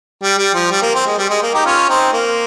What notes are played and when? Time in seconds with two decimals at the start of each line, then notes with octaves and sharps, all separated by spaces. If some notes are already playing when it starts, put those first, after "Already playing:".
0.23 G3
0.38 G3
0.55 F3
0.71 G3
0.82 A#3
0.95 C4
1.06 G#3
1.18 G3
1.30 G#3
1.43 A#3
1.54 D#4 G4
1.65 C#4 F4
1.89 C4 D#4
2.13 A#3